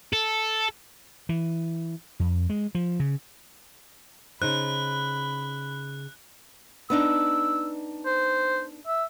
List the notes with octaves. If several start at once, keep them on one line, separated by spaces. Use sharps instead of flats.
A4
E3
F2
G#3
F3
C#3
C#3 D#4 C5 B5 F#6
B3 D4 D#4 E6
C5
E5